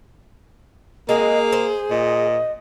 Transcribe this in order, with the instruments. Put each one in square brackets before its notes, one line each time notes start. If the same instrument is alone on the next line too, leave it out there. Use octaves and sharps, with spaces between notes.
[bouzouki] G#3 C4 F#4 [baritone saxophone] A#3 [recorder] G#4
[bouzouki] C5
[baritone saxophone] A#2 [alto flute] D#5